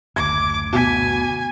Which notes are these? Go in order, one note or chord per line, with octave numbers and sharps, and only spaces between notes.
F#1 D2 D6 G#6
B2 G#5 B6